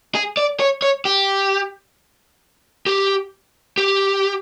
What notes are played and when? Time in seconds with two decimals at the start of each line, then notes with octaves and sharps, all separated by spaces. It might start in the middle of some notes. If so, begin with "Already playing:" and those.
0.15 G#4
0.37 D5
0.60 C#5
0.82 C#5
1.05 G4
2.86 G4
3.78 G4